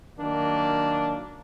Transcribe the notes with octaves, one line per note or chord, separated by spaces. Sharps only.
D#3 F#3 A#3 D4